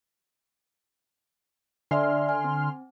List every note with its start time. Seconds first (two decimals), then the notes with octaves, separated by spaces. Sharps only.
1.91 D3 D5 E5 G#5 C6 F6
2.29 G#5
2.44 C4